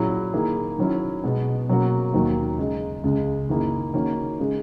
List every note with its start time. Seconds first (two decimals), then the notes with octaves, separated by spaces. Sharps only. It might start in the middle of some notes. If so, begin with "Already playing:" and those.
Already playing: A#2 F#3 C#4 E4 G#4
0.33 D#3 A#3 E4 G#4
0.78 D#3 F#3 C#4 E4
1.24 B2 G#3 B3
1.69 B2 F#3 A#3 C#4 F#4
2.14 D#2 D#3 F#3 A#3
2.59 C#3 G#3 D#4
3.04 C#2 C#3 G#3
3.49 F#2 D#3 A#3 E4 G#4
3.94 D#3 A#3 C#4 F#4
4.40 C#3 G#3